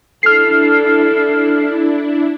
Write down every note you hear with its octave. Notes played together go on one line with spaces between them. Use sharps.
D4 E4 A4 F6 C7